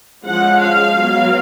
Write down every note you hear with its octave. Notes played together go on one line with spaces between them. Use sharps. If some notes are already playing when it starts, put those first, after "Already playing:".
F3 G#3 C#4 F#5
F5
F#3 B3